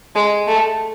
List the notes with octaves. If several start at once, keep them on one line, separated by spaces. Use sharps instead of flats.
G#3
A3